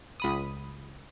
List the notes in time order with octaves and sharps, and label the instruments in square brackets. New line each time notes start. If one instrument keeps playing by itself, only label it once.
[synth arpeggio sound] C#2 B5 D#6